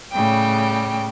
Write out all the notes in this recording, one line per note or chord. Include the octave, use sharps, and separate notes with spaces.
A2 C#3 G3 G5